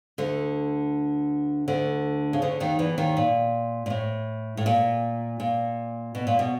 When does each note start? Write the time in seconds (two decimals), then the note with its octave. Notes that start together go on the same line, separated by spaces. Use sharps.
0.18 D2 D3
1.68 D2 D3
2.33 C#3
2.42 D2 D3
2.60 D#2 D#3
2.79 E2 E3
2.98 D#2 D#3
3.17 A#2
3.86 A#2
3.90 A2
4.57 A2
4.66 A#2
5.40 A#2
6.15 B2
6.27 A#2
6.39 B2